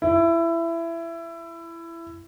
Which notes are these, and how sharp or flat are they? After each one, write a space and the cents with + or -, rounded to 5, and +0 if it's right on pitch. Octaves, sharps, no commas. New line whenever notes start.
E4 +20